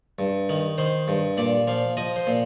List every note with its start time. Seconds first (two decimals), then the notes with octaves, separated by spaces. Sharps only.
0.19 G2
0.49 D#3
0.78 D#3 C5
1.08 G2
1.37 A#2 D5
1.67 F3 F5
1.97 F3 D#5
2.16 C5
2.27 A#2